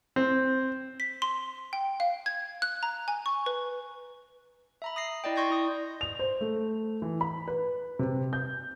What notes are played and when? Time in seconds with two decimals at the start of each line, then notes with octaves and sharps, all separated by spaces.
0.16 C4
1.00 B6
1.22 C6
1.73 G5
2.00 F5
2.26 G#6
2.62 F#6
2.83 A#5
3.08 G#5
3.26 C#6
3.46 B4
4.82 E5 A#5 B5
4.96 D#6 A#6 C7
5.24 E4 D5 D#5 G5
5.36 D5 C6 C#6 G6 G#6 A#6
5.50 E4 D#6
6.01 F7
6.19 C5
6.41 A3
7.02 E3
7.21 B5
7.48 B4
7.99 C3
8.33 G6